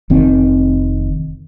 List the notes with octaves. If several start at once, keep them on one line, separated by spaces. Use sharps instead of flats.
F1 D#3 C4